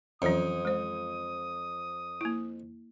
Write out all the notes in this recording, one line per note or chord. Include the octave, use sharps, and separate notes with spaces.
F2 E3 F#3 C#4 D#6
G#3 C5
A#3 E4